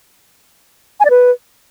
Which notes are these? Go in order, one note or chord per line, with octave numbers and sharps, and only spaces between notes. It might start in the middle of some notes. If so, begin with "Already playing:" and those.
G#5
D5
B4